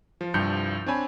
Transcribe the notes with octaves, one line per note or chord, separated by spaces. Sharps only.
F3
C2 G2 F3 G6 C#7
C4 D4 C#5 G#5 B5